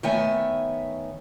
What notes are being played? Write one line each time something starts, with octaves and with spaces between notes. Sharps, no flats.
D#3 A3 B3 C#5 E5 G#5